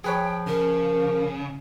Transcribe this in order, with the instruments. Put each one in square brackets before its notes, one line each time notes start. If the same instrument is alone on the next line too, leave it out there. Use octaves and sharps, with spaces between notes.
[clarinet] F3 [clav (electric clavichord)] G#4 B4 C#5 [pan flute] G5
[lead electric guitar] C#3 [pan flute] A#4